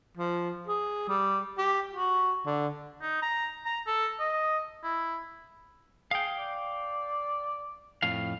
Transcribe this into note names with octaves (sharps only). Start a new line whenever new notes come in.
F3
G#4
G3
G4
F#4
D3
D#4
A#5
A#5
A4
D#5
E4
G#4 F5 G5
D5
F2 A2 F5